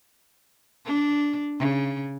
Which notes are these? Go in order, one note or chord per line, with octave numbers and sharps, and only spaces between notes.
D4
C#3